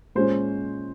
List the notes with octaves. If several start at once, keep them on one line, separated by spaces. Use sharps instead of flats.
A#2 G#3 C#4 C5